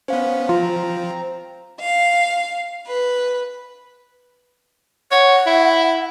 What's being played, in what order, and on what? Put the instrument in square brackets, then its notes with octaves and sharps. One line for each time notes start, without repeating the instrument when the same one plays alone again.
[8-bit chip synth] B3 C#4 [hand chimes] C5 F5
[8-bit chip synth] F3 [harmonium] C4 A#5 [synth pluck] F4
[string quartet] F5
B4
[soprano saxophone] C#5 [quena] F#5
[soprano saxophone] E4